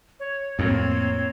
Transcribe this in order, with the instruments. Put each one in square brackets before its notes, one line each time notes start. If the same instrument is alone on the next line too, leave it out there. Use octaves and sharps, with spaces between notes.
[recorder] C#5
[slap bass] F2 A2 [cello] A#3 C4